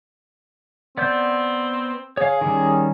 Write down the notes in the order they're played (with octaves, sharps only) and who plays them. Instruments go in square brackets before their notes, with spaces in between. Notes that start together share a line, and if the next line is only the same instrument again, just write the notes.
[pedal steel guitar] B3 D5 G6 [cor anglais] C4
[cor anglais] G#4 [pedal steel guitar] C#5 F5
[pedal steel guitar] D#3 G3 C#4